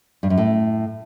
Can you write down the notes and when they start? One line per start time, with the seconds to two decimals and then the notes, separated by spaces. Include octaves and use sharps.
0.23 G2
0.30 F#2
0.38 A2